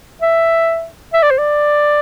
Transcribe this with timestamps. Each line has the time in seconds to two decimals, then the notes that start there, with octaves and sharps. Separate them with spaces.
0.22 E5
1.13 E5
1.22 D5
1.31 C5
1.38 D5